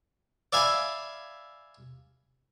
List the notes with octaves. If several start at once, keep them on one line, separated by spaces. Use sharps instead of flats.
D5 E5 F5 G#5 B5